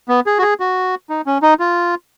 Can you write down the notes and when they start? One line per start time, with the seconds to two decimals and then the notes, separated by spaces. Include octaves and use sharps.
0.09 B3
0.26 G#4
0.38 F#4
0.42 G#4
0.60 F#4
1.10 D#4
1.26 C#4
1.42 D#4
1.60 F4